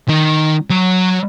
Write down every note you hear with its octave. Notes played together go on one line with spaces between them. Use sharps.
D#3 D#4
F#3 C#5